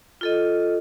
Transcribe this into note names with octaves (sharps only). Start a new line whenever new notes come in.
F4 A4 D#5